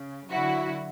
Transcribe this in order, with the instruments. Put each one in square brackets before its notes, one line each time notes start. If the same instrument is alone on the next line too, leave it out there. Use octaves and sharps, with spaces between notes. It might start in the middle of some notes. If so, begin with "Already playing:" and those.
Already playing: [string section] C#3
D3 F#3 E4 F#4